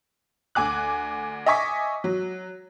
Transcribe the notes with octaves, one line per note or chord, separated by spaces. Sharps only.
D2 G#5 D6 F#6
D#5 E5 G#5 C#6 D6 B6
F#3